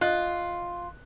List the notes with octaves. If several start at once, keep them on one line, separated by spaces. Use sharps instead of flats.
F4 D#5 F#6